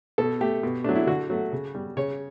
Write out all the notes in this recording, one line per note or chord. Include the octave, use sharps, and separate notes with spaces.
B2 A4
A3 G4
B2
F#3 A3 D4
E4
D3 F#4
F#3 A3
C#3
G3
C#3 C#5